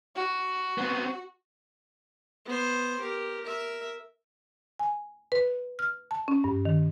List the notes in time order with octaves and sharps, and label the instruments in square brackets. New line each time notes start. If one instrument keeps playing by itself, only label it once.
[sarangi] F#4
[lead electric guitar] B3 C4
[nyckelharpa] B3 C5
G4 A#4
A#4 E5
[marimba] G#5
B4
F6
A5
C#4
G2
D#3